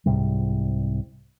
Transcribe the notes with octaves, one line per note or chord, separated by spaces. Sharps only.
C2 G#2 C3 G3